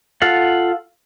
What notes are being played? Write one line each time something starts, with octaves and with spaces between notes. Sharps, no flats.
F4 A4 F5 F#5